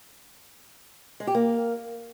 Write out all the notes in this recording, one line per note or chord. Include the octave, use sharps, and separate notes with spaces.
G#3
G4
A#3